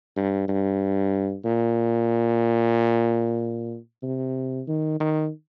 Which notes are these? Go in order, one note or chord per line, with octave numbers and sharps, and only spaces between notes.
G2
G2
A#2
C3
D#3
D#3